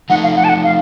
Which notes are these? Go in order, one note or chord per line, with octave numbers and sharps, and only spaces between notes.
F3 A3 D#4 F#5
F5
F#5
A5
F#5
F5